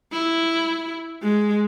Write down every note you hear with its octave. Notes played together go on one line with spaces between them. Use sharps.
E4
G#3